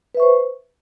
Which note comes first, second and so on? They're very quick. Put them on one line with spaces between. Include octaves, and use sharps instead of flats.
B4 E5 C#6 C5